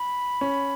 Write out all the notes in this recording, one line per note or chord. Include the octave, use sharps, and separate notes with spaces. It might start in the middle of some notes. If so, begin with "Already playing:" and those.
Already playing: B5
C#4